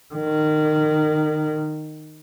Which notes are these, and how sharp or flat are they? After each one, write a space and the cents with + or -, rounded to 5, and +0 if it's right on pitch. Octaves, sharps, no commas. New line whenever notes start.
D#3 -20